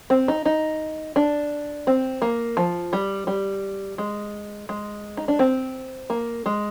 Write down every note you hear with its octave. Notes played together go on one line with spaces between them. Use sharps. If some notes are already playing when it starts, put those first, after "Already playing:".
C4
D#4
D#4
D4
C4
A#3
F3
G3
G3
G#3
G#3
D#4
D4
C4
A#3
G#3